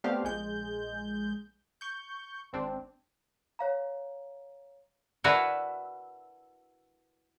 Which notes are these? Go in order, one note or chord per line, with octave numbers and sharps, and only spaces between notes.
A3 B3 C4 D4 G4 F5
A#1 G#3 G6
C#6 G6
G#1 C4 D4
C#5 F5 A#5
D4 E4 F#4 A#4 B4 E5